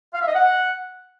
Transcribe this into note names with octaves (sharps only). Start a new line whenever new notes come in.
F5
E5
D#5
F#5